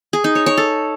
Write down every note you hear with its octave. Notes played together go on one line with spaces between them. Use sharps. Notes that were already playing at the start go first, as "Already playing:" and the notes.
G#4
D#4
C#5
C#5
A4